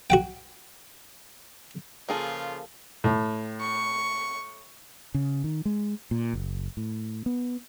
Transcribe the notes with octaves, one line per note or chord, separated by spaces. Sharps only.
F#4 F#5 G5
C#3 F3 A#3 F4 G#4 A4
A2
C#6
C#3
D#3
G#3
A#2
F#1
A2
B3